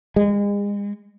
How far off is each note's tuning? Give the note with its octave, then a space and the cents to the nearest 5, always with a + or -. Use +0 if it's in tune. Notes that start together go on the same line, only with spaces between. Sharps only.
G#3 -35